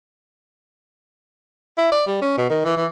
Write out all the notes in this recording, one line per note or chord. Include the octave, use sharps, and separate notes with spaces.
E4
D5
G3
C#4
B2
D#3
E3
E3